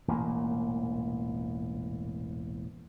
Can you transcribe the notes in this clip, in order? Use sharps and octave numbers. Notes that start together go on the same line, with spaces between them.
E1 A1 A#2 A#3